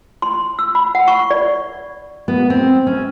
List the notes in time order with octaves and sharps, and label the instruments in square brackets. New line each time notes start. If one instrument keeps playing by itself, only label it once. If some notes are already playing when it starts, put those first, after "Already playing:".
[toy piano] C6
E6
B5
F#5
C#6
D5
[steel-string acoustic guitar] B3
C4
C#4